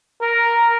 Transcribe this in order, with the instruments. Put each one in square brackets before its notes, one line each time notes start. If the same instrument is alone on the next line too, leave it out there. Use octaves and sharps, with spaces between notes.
[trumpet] A#4